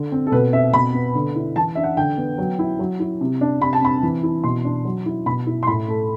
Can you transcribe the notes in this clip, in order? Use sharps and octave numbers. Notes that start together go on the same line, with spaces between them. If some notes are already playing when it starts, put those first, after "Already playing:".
Already playing: D3
C4
A4
B2 B4
C4 E5
B2 B5
B3
D3
E4
E3 A5
D4 E5
F#5
D3 G5
B3
F#3
E4
F#3
E4
C3
D4
C3 B5
A5
C4 B5
E3
E4
B2 C6
D4
F#3
E4
B2 B5
E4
C6
A2 B5
A3